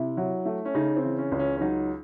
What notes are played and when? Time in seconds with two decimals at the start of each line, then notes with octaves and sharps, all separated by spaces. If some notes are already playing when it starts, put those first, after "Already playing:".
Already playing: C3 E4
0.17 F#3
0.46 A3
0.65 C#4
0.75 C#3 D#4
0.96 C4
1.04 E3
1.18 C#4
1.32 C#2
1.39 C#4
1.57 C#4
1.61 F#3 D#4